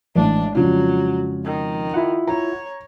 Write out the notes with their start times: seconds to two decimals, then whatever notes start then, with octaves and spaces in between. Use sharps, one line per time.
0.16 A1 G#3 D4
0.55 F2 C#3 F#3 F4
1.44 D#3
1.94 E4 F4 F#5
2.27 C#5 A#5